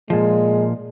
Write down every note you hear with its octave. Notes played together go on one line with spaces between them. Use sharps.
A#2 F3 G#3